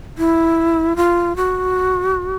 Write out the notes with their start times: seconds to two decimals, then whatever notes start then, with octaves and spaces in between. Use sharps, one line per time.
0.18 E4
0.96 F4
1.36 F#4